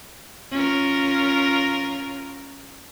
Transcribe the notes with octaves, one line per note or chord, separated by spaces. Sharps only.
C#4 F4 A#4